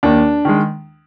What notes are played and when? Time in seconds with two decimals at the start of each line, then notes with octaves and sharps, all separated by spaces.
0.03 D#2 D4
0.45 D#3 G#3